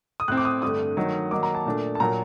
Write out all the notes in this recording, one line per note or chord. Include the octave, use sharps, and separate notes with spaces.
D#6
A2 A3 C4 F#6
D6
D#6
G2 D3 A3 D#6
D#3 F#3 A3 D#4
D#3 F#3 A#3 D6
A#5
A5
A#2 A3 D4
A5
A#2 F#3 A#3 A#5